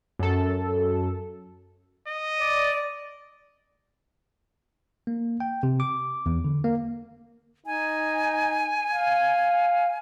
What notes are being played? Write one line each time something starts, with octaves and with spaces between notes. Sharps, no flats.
F#2 A4
D#5
D5
A#3
G5
C3
D6
E2
D3
A#3
D#4 G#5
F5